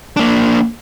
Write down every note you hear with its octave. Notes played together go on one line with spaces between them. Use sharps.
A#3 D4